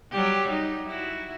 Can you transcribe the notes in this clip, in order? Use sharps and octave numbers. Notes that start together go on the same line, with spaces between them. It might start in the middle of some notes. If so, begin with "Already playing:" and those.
F#3 G3 G4
D#4
E4 F#4